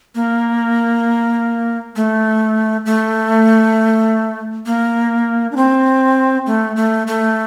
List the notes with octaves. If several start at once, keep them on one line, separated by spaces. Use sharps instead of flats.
A#3
A3
A3
A#3
D4
C4
A3
A3
A3